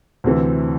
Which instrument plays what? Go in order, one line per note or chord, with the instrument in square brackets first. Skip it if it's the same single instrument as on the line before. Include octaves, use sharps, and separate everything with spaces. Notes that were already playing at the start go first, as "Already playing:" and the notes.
[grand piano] D2 C3 E3